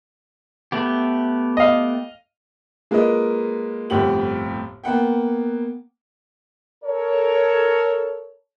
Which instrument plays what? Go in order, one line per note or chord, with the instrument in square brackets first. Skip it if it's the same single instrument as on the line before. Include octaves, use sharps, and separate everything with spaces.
[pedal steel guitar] A3 B3 G4
[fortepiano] D#5 F5
[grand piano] G#3 A#3 F4 A#4 B4 D#5
G1 F2 A2 G4 F#5 F#7
A#3 B3 F#5 G5
[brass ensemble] A4 A#4 C#5